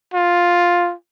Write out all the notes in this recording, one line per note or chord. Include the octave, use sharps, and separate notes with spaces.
F4